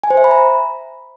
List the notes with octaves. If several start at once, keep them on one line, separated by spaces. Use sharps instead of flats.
G#5
C5
E5
B5
A#5